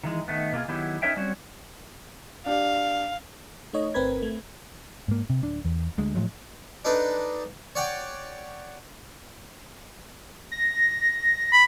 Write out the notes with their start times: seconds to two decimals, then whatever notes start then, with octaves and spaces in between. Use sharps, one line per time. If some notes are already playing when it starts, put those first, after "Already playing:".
0.04 D#3 E3 G#3
0.28 D#3 A3 B3
0.52 B2 A#3 F4 G#4
0.68 D#3 F#3 B3 E4 G4 G#4
1.02 C#4 D#4 A#4 C#5 E5 G5
1.16 F#3 G3 C4 C#4 F#4 C#5
2.46 D4 G4 D5 F5
3.73 A3 D#4 C#5 D#5
3.94 G1 C4 A#4 B4 B5 G#6
4.22 A3
5.08 G#2 A#3
5.30 C3
5.42 D1 D4
5.65 E2
5.98 D2 G#3
6.15 A2 F3 F#3 G#3
6.85 D4 D#4 A4 B4
7.75 C#5 D5 F#5 G5
10.52 A#6
11.52 B5